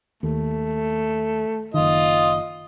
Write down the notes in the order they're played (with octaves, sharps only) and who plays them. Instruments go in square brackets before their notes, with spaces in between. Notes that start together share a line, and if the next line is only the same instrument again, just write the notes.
[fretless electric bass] D#2 [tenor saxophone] A3
[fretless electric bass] F#1 D#3 [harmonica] F4 D#5